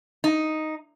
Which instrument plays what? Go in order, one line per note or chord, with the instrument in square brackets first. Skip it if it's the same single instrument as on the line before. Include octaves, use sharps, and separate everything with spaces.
[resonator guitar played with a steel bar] D#4